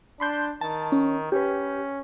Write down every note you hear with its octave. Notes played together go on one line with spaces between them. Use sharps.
D4 B5 C6 G6
D#3 A5
C#4
C#4 G4 B4